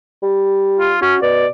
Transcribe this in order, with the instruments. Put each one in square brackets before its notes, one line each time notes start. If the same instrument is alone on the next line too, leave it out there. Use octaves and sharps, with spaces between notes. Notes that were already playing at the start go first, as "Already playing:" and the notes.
[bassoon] G3
[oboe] F4
[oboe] C#4 [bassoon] F#4
[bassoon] B2 [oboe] D5